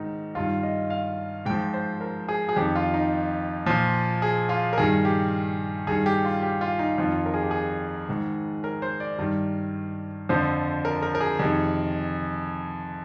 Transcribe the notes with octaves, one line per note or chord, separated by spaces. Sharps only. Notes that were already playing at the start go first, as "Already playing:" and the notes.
Already playing: G#2 D#3 D#4
G2 D#3 F4
D#5
F5
G#2 F3 G5
C5
A#4
G#4
G#4
F2 D#3 G4
F4
D#4
A#2 F3
G#4
F4
A#4
G2 D#3 G#4
G4
G2 D#3 G#4
G4
F4
G4
F4
D#4
F2 D#3 F4
A#4
G#4
G4
G#4
G#2 D#3
A#4
C5
D5
G2 D#3
F2 D3 F3 C5
A#4
A#4
A#4
G#4
F2 C3 D#3